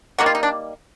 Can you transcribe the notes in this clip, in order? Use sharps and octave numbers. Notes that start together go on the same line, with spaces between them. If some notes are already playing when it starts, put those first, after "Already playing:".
D#3 G3 A#3 F#4
F4
D#4
D4